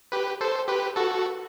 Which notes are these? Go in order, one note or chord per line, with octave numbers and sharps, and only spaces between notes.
G4 B4
A4 C5
G4 B4
F#4 A4